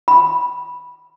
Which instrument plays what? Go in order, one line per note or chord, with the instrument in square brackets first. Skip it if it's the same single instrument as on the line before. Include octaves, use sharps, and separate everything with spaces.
[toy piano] B5